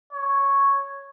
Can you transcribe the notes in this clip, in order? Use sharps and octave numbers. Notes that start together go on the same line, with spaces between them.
C#5